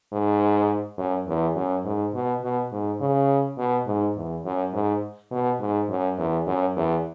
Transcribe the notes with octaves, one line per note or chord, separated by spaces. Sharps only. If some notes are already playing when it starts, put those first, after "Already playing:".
G#2
F#2
E2
F#2
G#2
B2
B2
G#2
C#3
B2
G#2
E2
F#2
G#2
B2
G#2
F#2
E2
F#2
E2